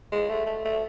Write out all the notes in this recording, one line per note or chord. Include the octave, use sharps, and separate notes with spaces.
G#3
A3
A3
A3